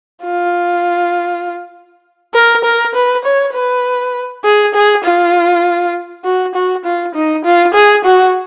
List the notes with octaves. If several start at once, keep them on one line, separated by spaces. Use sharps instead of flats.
F4
A#4
A#4
B4
C#5
B4
G#4
G#4
F4
F#4
F#4
F4
D#4
F4
G#4
F#4